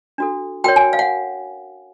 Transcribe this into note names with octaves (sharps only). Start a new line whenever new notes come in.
D4 F#4 A4
F#4 A#4 C#5 G5
G#5
F5
F#5